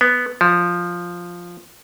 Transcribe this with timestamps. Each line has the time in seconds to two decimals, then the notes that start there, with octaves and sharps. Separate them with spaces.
0.01 B3
0.41 F3